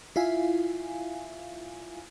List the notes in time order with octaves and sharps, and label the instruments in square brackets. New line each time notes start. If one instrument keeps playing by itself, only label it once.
[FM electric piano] E4 F4 E5 F5 G#5